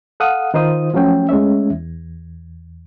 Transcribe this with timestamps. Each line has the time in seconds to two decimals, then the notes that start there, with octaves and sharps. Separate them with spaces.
0.20 A4 F5 F#5 D#6
0.54 D#3 D#4 F4 C5 D#6
0.94 F3 F#3 A3 C#4 G5
1.29 G#3 A3 C#4 E5
1.70 E2